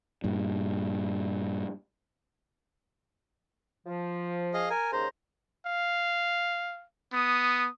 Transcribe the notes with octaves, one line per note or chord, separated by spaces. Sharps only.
G2 A#2
F3
G#4 D#5 F5
A#4 G#5
D#2 C#3 C5 A#5
F5
B3 D#6